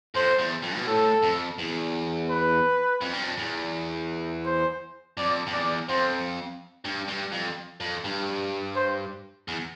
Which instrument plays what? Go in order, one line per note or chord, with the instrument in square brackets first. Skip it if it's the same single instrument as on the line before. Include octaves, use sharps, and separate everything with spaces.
[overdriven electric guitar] F2 [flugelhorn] C5
[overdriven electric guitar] E2
F2
B2
[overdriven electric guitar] A2 [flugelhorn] A4
[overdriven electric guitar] F2
E2
[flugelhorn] B4
[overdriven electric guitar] F2
G2
F2
E2
[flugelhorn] C5
[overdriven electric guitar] F2 [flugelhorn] D5
[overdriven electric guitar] F2
[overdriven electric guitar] E2 [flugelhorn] D5
[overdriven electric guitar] F2 [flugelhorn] C5
[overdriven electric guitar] G2
G2
F2
F2
G2
[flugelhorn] C5
[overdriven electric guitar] E2